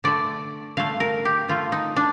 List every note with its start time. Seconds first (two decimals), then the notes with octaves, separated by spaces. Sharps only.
0.04 D3 A3 D5
0.77 D3 A3 F5
1.00 A#4
1.25 G4
1.48 D3 A3 F4
1.72 D#4
1.96 D4